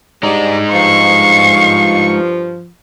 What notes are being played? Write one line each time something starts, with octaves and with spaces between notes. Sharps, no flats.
G3 G#3 D4 D#4 D5
G2 F3 F5 C#6